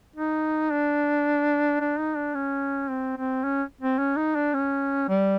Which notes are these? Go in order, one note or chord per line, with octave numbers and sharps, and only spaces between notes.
D#4
D4
D4
D#4
D4
C#4
C4
C4
C#4
C4
C#4
D#4
D4
C#4
G3